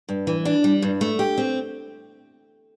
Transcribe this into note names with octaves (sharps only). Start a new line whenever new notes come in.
G2
E3
D4
G3
G2
A3
G4
C4